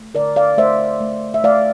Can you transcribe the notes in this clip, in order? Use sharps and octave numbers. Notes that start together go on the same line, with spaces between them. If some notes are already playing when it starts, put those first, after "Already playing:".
Already playing: A3
D3 A#4 D5
D5 F5
A3 C5 E5
A3
E5
A3 D5 F5